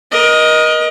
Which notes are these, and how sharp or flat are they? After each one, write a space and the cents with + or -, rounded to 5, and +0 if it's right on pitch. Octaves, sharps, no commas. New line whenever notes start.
A#4 +35 D#5 +0